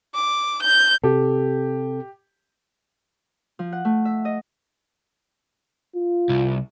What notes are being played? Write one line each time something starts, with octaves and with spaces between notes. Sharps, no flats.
D6
G6
C3 G4 A4
F3
F#5
A3
E5
D#5
F4
C2